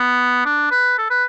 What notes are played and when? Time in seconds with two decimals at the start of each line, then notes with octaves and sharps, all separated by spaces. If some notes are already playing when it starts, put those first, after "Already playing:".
Already playing: B3
0.45 D4
0.71 B4
0.98 A4
1.10 B4